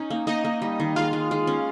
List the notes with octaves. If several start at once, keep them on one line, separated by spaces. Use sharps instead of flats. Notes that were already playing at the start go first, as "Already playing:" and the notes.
Already playing: C#4 D#4
A#3
A#3 D#4 D#5
A#3
G3
D#3
G#3 F4 F5
G#3
G#3
C#4